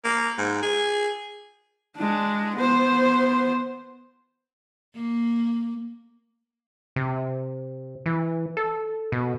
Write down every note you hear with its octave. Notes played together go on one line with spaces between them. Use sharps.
A#3
G#2
G#4
G#3 D4
B3 C5
A#3
C3
E3
A4
B2